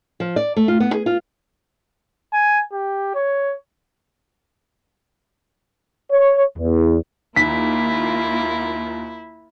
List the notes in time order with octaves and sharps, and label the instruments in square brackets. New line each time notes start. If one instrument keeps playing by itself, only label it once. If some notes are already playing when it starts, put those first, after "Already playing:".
[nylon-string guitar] F3
D5
A3
F4
B3
G#4
F4
[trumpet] G#5
G4
C#5
[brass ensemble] C#5
E2
[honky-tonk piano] D#2 [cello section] A#3 F4 [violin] E4 [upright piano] B6